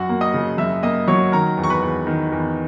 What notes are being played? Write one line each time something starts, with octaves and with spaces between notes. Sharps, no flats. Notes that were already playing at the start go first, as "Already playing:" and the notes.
Already playing: F#2 F#4 F#5
A#3
D#5 D#6
C#3
F#2 E5 E6
A#3 D#5 D#6
F#3 C#5 C#6
D#3 A#4 A#5
E2
C#6
B4 B5
E2
D#3
E2